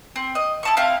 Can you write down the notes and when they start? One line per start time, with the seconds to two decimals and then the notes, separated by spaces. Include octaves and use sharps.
0.16 C4
0.35 D#5
0.63 E4 A5 C#6
0.77 C4 E4 F5